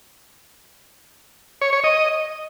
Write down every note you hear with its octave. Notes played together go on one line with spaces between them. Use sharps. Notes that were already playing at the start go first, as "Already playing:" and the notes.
C#5
C#5
D#5